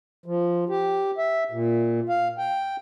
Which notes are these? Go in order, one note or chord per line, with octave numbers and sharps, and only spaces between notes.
F3
G4
E5
A#2
F5
G5